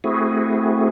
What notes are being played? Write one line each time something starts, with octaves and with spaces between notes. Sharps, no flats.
A3 C4 E4 F#4 G#4